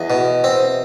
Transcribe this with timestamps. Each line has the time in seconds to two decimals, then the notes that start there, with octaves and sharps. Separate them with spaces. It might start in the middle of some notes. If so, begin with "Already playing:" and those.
Already playing: E2 D#5
0.10 B2
0.44 C4